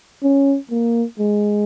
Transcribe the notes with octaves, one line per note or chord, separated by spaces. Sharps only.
C#4
A#3
G#3